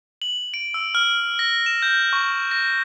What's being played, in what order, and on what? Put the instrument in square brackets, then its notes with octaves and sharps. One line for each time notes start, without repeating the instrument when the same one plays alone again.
[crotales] F#7
D7
E6
F6
A#6
E7
G6
C#6
A#6